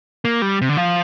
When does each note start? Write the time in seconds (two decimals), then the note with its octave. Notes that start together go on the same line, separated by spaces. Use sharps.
0.25 A#3
0.42 G3
0.61 C3
0.69 D3
0.77 F3